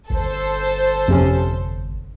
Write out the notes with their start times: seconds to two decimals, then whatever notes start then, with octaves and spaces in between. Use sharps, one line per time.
0.10 G1 A4 C5
1.08 F2 C3 C#4